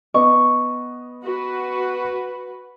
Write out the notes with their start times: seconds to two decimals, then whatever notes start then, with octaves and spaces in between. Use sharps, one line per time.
0.14 B3 D#5 C#6 D6
1.24 F#4 B4